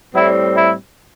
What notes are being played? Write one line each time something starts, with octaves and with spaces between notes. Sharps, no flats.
A2 G3 C4 E4
E4